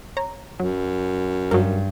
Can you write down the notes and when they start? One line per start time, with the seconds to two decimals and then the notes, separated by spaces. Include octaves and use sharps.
0.17 C#5 A#5
0.60 F#2 F#3
1.51 G2 F#3 A#4